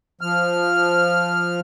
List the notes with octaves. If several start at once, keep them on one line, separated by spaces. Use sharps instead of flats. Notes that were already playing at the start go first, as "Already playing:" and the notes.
F3 F6